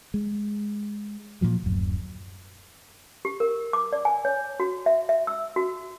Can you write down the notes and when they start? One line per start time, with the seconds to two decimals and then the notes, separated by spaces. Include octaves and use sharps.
0.14 G#3
1.41 A#2 C#3 F3 F#3
1.64 D1 F#2
3.25 G4
3.40 A#4
3.73 D6
3.93 D5
4.05 G#5
4.25 C#5
4.60 F#4
4.86 E5
5.09 E5
5.27 E6
5.56 F#4